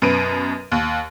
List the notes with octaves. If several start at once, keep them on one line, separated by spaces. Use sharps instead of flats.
F#2 B2 B4 D7 D#7
D#2